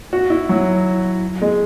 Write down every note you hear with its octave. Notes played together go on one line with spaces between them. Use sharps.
F#4
E4
F#3
G#3